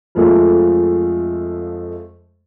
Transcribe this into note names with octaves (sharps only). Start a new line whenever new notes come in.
F2 F3 G#3 A3